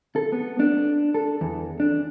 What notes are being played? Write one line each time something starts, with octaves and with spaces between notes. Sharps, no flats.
A4
B3
D4
A4
E2
D4